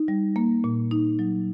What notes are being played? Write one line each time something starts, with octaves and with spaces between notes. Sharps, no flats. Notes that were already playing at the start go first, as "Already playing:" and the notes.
Already playing: D#4
G3
A#3
A#2
D#4
F#3